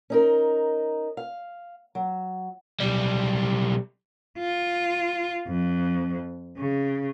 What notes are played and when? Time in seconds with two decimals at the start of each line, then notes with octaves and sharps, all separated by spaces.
0.10 C#4 D#4 A#4
1.17 F5
1.95 F#3
2.80 B1 G3
4.39 F4
5.47 F2
6.57 C#3